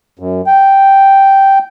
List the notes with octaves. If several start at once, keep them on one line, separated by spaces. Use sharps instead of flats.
F#2
G5